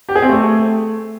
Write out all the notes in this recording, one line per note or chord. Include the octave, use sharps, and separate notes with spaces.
G4
G#4
C4
A3